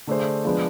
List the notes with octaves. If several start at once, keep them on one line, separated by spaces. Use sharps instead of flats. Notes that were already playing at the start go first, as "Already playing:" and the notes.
D3 A3 D4 G#4 C5
F3 G#3 B3 D4